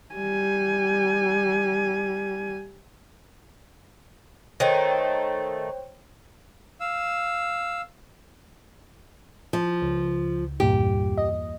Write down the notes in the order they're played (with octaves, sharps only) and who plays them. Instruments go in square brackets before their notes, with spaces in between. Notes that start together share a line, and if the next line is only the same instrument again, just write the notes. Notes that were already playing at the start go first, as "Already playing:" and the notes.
[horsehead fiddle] G3 G#5
[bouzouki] D#3 A3 [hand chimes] C5 C#5 G5
[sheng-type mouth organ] F5 E6
[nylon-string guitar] F3
[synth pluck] C#2
[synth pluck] E2 G2 A#2 [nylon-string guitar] G4
[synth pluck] D#5